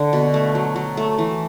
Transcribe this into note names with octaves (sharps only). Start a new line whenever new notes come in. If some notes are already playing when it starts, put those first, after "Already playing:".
Already playing: D3
B2
A3
F#3
F#3
A3
E3